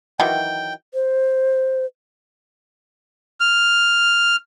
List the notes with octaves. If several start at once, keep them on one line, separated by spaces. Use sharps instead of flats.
D#3 E3 F#3 G5
C5
F6